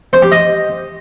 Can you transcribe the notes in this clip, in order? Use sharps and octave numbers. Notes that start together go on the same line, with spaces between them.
C5
G4
D#5